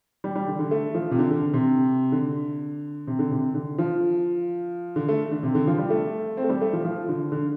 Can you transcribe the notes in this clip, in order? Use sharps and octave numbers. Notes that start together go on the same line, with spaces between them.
G3
G3
D3
D3
A3
F3
C3
D3
D3
C3
D3
C3
D3
C3
D3
F3
D3
A3
D3
C3
D3
F3
G3
A3
C4
A3
G3
A3
F3
F3
D3
D3